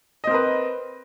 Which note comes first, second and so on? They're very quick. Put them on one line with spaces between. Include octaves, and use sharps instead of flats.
D#5 C4 A#4 B4